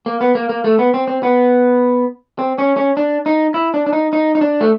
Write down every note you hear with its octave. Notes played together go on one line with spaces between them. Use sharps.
A#3
B3
A#3
A#3
A3
B3
C4
C4
B3
C4
C#4
C#4
D4
D#4
E4
D4
D4
D#4
D#4
D#4
D4
A3